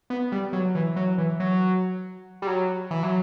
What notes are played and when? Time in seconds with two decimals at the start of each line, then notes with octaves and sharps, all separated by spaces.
0.10 B3
0.32 G3
0.53 F#3
0.75 E3
0.96 F#3
1.18 E3
1.40 F#3
2.42 G3
2.47 F#3
2.91 E3
3.03 F#3